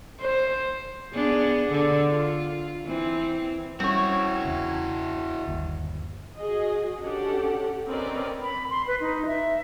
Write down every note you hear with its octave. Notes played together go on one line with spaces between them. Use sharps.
C5
B3 D4 G#4
D3
F4
E3 C4
G3 C4 C#4 E4 F#4 C#5
E2 C#3
G1 D#2
F#4 G#4 D#5
C#4 D4 G4 A4 F#5
C4 C#4 A#4 B4 D5 D#5
B5
C6
B4
D#4
E5